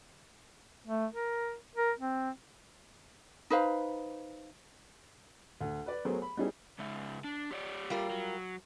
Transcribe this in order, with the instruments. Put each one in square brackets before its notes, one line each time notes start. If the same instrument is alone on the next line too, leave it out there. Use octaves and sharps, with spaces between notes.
[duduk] A3
A#4
A#4
C4
[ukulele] D#4 B4 C5 F5
[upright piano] D2
B4 D5
F#3 A3 B3 G#4 A#4 C5
B5
G3 B3 C#4 D#4 E4 G#4
[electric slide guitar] C#3 G#3 E5
D4
G4 C#5 D5
[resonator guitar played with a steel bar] G3 F4 A#4
[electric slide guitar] F#3